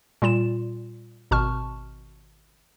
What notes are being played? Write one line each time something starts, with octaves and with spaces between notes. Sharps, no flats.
A#2 G3 F4 E7
G#1 B2 A5 C#6 F6